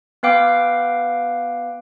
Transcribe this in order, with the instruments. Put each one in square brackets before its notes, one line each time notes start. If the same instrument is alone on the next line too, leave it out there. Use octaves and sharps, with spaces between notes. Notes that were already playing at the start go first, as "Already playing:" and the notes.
[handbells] B3 B4 F5 G5 D6